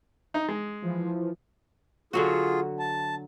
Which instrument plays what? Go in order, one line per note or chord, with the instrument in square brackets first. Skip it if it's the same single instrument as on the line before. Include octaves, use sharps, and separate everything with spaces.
[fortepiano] D#4
G#3
[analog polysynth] E3 F3
[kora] D3 F#3 F#4 [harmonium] F4 G#4
[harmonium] A5